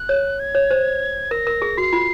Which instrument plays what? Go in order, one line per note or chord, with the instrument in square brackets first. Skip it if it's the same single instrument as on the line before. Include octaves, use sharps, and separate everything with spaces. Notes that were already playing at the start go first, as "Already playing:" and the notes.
Already playing: [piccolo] F#6
[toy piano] C#5
[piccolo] G#6
[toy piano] C#5
C5
[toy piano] A#4 [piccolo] A#6
[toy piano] A#4
G#4
[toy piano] F#4 [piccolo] C7
[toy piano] F4